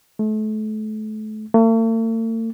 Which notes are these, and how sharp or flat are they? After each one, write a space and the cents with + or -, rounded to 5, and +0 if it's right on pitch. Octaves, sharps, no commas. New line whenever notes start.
A3 -35
A3 +45